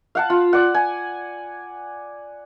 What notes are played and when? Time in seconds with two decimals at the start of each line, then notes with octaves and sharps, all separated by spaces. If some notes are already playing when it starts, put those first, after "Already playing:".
0.15 F5 F#5 A5
0.30 F4
0.53 D5 F#5
0.74 G#5